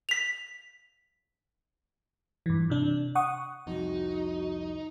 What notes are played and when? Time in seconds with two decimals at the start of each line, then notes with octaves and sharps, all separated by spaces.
0.09 B6 F7
2.46 G2 E3
2.70 C3 D4
3.15 F#5 C#6 D#6
3.67 C2 F2 D#4 F#4